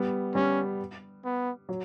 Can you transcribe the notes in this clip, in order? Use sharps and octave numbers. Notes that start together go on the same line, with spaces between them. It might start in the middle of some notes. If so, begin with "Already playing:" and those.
Already playing: G3 B3
G3 C#4
B3
F#3